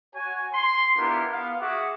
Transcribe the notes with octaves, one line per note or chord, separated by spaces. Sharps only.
F#4 C#5 G#5
C6
B3 D4 E4 F4 G4 A#4
B3 F5
F#4 G#4 E5 F#5 D6